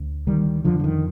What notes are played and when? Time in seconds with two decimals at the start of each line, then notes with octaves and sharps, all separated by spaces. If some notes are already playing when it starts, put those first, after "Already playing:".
Already playing: D2
0.27 D3 D#3 G3
0.64 F2 D3 F3
0.80 F3
0.84 D#3